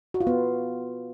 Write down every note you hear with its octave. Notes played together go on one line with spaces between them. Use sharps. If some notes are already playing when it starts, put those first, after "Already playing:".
F#4
F4
B3